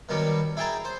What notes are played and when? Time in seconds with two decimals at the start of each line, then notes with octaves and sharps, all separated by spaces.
0.09 B2 D#3 F#3 G3 B3
0.57 E4 G#4 G5 A5 A#5
0.85 C5